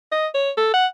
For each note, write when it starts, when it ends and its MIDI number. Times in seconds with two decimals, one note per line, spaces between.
0.12 0.27 75
0.35 0.51 73
0.57 0.70 69
0.74 0.86 78